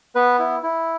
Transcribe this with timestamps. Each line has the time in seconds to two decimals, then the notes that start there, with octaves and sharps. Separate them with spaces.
0.15 B3 B4
0.39 E4
0.63 E4